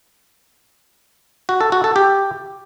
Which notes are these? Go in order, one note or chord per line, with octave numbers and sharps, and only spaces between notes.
F#4
A4
F#4
A4
G4